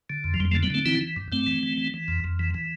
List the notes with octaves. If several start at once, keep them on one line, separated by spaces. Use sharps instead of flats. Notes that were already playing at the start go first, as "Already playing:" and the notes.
D3
F2
F3
F2 G3
F3 A3
D3
G3 B3
D3 A3 C4
E3 C4 E4
E3
G2
G2 A3 C4
E3
E3
E3
E3
F2
F2
E3
E3